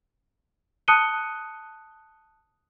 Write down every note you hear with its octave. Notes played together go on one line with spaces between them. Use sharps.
A5 D#6 F#6 C#7 D#7 G7